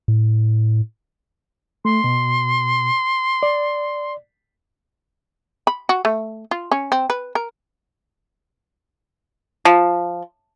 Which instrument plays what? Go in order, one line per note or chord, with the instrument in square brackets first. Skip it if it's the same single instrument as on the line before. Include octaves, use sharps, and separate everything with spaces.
[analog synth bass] A2
[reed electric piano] A3 [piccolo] C6
[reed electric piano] B2
D5
[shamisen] B5
F#4
A3
F4
C#4
C4
B4
A#4
[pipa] F3